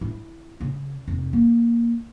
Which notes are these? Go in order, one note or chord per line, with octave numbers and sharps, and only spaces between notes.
E4
C#3
F1
A#3